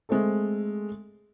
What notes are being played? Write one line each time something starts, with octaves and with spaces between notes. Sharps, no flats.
G#3 A3 C4 A4